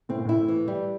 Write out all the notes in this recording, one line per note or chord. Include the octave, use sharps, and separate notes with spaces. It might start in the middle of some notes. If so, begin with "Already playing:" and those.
A2 C4
A#2
A2 E4
E3
G3